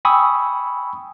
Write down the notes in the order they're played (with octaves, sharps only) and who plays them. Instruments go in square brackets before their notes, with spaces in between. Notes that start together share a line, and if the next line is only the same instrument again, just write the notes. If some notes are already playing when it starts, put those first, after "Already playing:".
[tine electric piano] G5 G#5 B5 C#6 D#6 E6